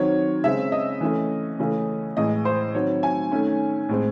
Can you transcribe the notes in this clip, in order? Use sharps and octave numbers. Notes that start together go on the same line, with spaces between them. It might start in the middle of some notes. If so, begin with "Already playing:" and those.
Already playing: D#3 F#3 C4 C#5
C#3 G#3 C4 E5
D#5
E3 A3 C#4
C#3 E3 A3 C#4
A2 E3 G#3 D#5
C5
D#3 F#3 C4 C#5
G#5
D#3 A3 C#4
A2 G#3 C4